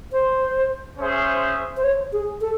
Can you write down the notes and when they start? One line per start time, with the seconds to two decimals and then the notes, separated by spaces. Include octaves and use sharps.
0.12 C5
0.99 C#4 G#4 C5 E5
1.77 C5
1.84 C#5
2.13 G#4
2.41 A4